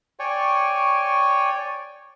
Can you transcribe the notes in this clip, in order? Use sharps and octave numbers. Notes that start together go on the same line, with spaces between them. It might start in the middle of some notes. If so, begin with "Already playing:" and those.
C#5 D5 G5 G#5 C#6